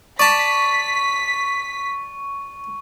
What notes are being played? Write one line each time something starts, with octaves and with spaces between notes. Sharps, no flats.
D5 A5 C#6 B6